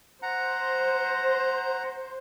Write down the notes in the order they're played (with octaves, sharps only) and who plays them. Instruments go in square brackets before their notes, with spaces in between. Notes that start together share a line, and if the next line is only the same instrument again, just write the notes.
[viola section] C5 [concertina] F#5 A#5